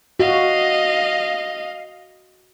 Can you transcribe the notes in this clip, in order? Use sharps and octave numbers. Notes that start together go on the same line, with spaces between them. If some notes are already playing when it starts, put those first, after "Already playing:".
F#4 D#5 F5